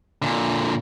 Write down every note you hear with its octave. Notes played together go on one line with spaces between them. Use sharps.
A#2 D3